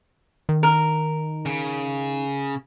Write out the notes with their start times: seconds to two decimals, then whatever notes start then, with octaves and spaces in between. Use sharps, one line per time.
0.49 D#3
0.63 A#4
1.46 C#3